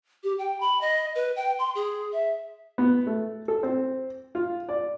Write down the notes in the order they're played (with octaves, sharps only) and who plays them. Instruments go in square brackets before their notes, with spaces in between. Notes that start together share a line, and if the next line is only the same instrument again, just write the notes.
[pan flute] G4
G5
B5
D#5
B4
G5
C6
G#4
E5
[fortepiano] B3
A3
A4
C4
F4
D5